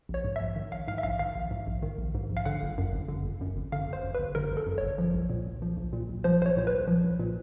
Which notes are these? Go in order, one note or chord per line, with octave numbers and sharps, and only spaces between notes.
A#1 C#5
G#2
A#1 E5
D#3
A#1 F5
G#2 F5
E5
A#1 F5
D#3 F5
A#1
G#2
A#1
D#3
A#1
G#2
A#1
F5
D3 F#5
G1
F#2
G1
D3
G1
F#2
G1
D3 F5
G1
C5
F#2
G1 B4
D3 A#4
G1
A4
F#2
G1 C#5
F3
B1
A#2
B1
F3
B1
A#2
B1
F3 C5
B1 C5
C#5
A#2 C5
B4
B1
F3
B1
A#2